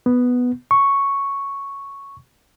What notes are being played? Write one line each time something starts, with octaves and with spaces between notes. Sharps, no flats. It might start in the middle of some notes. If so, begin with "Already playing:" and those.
B3
C#6